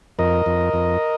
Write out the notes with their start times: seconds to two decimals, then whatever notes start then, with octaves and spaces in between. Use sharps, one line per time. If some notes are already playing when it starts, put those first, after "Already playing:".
0.19 F2 A#4 D#5
0.46 F2
0.73 F2